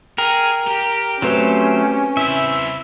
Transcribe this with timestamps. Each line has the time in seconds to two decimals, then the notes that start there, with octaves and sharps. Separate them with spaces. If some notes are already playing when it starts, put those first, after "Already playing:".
0.18 G#4 A#4 G5
0.67 G4
1.22 F#3 A3 C4 C#4 B4 C5
2.17 E4 C5 E5